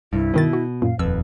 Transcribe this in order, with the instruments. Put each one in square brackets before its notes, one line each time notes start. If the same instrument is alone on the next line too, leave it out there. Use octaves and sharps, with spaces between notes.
[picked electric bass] C2 G2 [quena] E4
[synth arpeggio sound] G2 D#3 A6 [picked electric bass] B2
[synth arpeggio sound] F#4
[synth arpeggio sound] F#2 A#2 [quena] F5
[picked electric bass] D#1 F2 [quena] B4 [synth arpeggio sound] E6